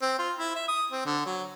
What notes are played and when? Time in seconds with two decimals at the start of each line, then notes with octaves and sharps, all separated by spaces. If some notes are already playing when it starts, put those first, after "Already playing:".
0.02 C4
0.18 F4
0.38 E4
0.55 E5
0.68 D#6
0.92 C4
1.05 D3
1.25 F#3